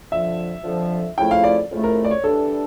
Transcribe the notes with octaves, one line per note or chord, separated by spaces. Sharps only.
F2 D3 F3 E5
F2 D3 F3
F2 C#3 F3 A3 E4 G5
F5
D5
F2 C#3 F3 A3 E4
A#4
D5
C#5
E3 G3 D4 A4